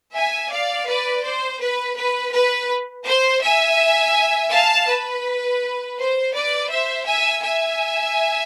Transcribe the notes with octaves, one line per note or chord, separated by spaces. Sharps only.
E5 G#5
D5 F5
B4 D5
C5
B4
B4
B4
C5
E5 G#5
F5 A5
B4
C5
B4 D5
C5 E5
E5 G#5
E5 G#5